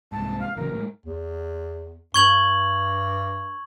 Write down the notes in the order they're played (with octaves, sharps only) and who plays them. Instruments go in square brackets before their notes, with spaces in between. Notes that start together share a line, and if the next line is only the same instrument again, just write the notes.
[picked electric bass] C2 G#2 [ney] A5
[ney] F5
[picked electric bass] A1 C#3 F#3 [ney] A#4
[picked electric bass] A2 F#3 G#3
[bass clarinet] E2
[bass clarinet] G2 [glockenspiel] C#6 G#6 F#7